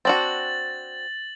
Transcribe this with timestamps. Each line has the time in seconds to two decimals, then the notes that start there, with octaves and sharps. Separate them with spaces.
0.05 C4 D4 F#4 A6 F#7